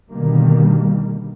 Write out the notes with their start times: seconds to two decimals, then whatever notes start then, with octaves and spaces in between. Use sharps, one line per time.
0.10 B2 D3 D#3 G3 A#3